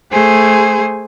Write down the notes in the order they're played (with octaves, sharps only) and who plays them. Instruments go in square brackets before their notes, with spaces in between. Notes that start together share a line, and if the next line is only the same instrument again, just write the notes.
[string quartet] A3 G#4 C5 G#5